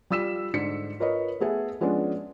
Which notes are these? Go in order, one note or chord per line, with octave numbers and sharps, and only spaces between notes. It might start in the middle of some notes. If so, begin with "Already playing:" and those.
G3 F4 E6 B6 E7
G#2 D3 D5 B6 C#7
F4 A#4 B4 C#5 D#5
A3 B3 G#4 A4 E5
F3 G#3 B3 C#4 D4